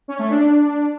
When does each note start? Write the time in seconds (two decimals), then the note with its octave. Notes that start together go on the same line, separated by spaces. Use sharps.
0.08 C#4
0.19 A3
0.30 D4